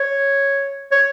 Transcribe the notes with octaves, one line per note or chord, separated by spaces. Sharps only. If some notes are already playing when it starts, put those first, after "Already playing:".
Already playing: C#5
C#5